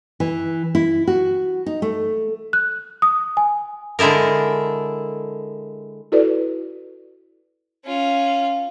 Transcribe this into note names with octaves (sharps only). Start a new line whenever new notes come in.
E3
E4
F#4
D#4
A3
F#6
D#6
G#5
D3 G#3 E4 A4 A#4
E4 F#4 A4 B4 D5
C#4 F4